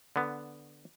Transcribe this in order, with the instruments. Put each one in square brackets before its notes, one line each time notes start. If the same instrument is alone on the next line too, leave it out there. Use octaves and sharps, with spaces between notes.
[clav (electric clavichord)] D3 B3